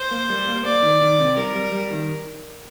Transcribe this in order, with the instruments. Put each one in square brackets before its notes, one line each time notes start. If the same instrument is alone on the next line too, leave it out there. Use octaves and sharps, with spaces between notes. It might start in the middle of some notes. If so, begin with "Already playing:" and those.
Already playing: [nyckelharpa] C5
[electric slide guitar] A#3
G3
A#3
[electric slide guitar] A#3 [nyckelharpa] D5
[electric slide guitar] D#3
D#3
C3
[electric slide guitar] G3 [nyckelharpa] A#4
[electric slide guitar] G3
G3
D#3